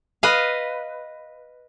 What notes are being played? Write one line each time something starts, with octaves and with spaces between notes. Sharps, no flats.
B4 D#5 F5